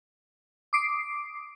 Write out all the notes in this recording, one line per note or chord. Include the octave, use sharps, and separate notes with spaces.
D6 D#6 C7 D7